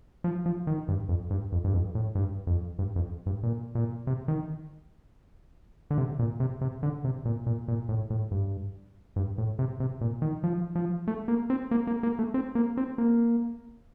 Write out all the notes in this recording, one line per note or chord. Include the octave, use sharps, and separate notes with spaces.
F3
F3
D#3
G2
F2
G2
F2
G2
F2
A2
G2
F2
G2
F2
G2
A#2
A#2
C3
D#3
D3
C3
A#2
C3
C3
D3
C3
A#2
A#2
A#2
A2
A2
G2
G2
A2
C3
C3
A#2
D#3
F3
F3
A3
A#3
C4
A#3
A#3
A#3
A3
C4
A#3
C4
A#3